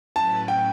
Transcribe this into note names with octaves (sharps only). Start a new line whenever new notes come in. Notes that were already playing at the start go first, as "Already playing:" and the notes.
A2 F#3 C#4 E4 B4 A5
G5